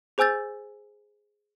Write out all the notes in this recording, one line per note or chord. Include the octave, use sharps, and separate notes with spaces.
G#4 C5 G#5 E6 G6 A6